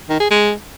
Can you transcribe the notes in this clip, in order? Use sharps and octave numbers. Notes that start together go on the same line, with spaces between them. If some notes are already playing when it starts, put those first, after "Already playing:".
D#3
G#4
G#3